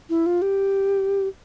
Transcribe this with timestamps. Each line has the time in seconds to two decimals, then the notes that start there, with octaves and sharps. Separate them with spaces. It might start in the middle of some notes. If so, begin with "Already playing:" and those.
0.09 E4
0.26 F4
0.42 G4